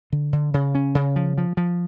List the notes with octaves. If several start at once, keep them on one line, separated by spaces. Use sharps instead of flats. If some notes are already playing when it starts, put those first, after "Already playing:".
D3
D3
C#3
C#4
C#3
F3
F3
F3